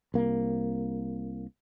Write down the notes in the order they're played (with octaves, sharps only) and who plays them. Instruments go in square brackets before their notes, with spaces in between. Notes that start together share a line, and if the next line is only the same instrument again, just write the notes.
[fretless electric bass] C2 A#3